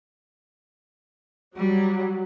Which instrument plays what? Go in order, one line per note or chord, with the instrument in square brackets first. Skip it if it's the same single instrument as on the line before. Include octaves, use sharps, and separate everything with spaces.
[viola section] F#3 [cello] G3